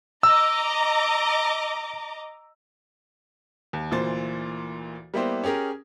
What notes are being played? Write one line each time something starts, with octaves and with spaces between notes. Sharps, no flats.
D#5 A#5 D6 E6
D#2
D2 A#2 E3 C5 A6
G3 A#3 B3 E4 G4 C5
C#4 G4 G#4 A#4